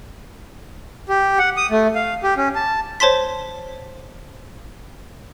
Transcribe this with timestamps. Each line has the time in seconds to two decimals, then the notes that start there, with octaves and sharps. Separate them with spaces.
1.09 G4
1.39 F#5
1.57 D#6
1.71 A3
1.95 F5
2.23 G4
2.37 C#4
2.55 A5
3.00 C5 C#5 A5 C6 B6